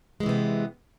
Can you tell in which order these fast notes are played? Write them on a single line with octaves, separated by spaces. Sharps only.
G#3 E3 C3 B3